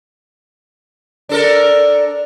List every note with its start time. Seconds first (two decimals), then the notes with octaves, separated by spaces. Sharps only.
1.29 D4 A4 A#4